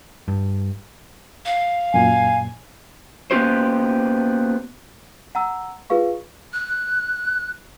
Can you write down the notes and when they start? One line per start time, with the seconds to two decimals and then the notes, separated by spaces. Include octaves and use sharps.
0.28 G2
1.45 F5
1.94 F#2 A#2 G#5
3.31 A#3 B3 C#4 G4 C5
5.35 F#5 A#5 E6
5.90 F4 G#4 B4 F5 C#6
6.53 F#6